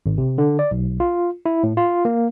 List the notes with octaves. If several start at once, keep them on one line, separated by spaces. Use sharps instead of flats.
G#1
C3
D3
D5
B1
F4
E4
A2
F4
A#3